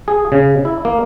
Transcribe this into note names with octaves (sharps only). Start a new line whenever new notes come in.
G#4
C#3
E4
A#3